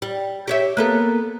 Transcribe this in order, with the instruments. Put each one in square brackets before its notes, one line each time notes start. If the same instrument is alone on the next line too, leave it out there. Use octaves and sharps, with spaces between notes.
[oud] G3
G4 C#5 E5
A#3 B3 A4